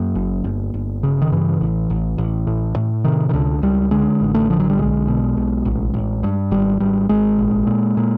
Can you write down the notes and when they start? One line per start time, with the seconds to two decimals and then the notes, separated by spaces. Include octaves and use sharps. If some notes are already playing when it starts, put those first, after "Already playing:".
Already playing: F#2 A#3
0.15 F#1
0.44 G1
0.74 G1
1.03 C#3
1.22 D#3
1.32 G2 E3
1.61 A1
1.90 A1
2.18 A1
2.47 A2
2.76 A2
3.04 C3 D#3
3.29 D#3
3.33 C#2 D3
3.63 C#2 G3
3.91 D3 G#3
4.21 A1
4.34 A3
4.50 D3 F3
4.60 F#3
4.70 G3
4.79 B1 G#3
5.08 B2
5.37 B1
5.65 A1
5.94 A1
6.23 G2
6.51 G#1 G3
6.80 G#1 G3
7.09 G#1 G#3
7.38 A#1
7.67 A#2
7.97 A#2